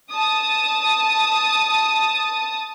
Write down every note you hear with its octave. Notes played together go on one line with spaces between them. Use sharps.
A5 D#6